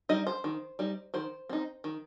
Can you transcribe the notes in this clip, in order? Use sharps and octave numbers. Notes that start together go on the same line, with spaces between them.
G3 D#4 D#5
C5
D#3
G3 D#4
D#3 C5
C4 D#4
D#3